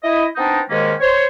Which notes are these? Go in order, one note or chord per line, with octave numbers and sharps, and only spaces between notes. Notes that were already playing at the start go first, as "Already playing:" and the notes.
E4 D#5
B3 C4 D4 D#4
D#2 G#2 D#3 G#3 A#3 C#4
C5 C#5